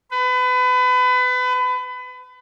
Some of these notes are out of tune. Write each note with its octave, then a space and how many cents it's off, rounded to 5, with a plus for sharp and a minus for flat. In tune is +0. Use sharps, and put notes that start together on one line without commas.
B4 +30